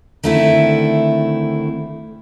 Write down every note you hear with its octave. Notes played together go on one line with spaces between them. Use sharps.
D3 D#3 A3 C4 E4